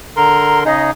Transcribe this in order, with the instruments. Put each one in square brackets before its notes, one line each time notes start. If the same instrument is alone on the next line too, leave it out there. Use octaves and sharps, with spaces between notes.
[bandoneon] D3 A#4 C6 [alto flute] A#5
[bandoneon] C#3 D#4 G#4 [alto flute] D#5